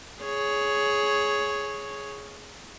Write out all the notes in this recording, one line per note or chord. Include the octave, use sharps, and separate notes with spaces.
G#4 C#5